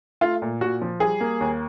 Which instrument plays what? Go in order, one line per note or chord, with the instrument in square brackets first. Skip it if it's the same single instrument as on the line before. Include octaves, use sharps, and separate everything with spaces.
[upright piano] A3 F4
A#2
A#2 F#4
F3
G3 G#4
A#3
D#2